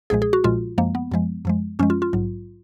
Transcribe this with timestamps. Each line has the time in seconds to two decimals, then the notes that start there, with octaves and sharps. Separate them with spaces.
0.10 B1 A#2 F3 G#3 G#4
0.22 G#4
0.33 F#4
0.44 B1 A#2 F3 G#3 F4
0.78 F#2 F3 G#3 A#3
0.95 B3
1.12 F#2 F3 G#3
1.45 F#2 F3 G#3
1.79 F#2 F3 G#3 C#4
1.90 F4
2.02 F4
2.13 A#1 G#2 F#3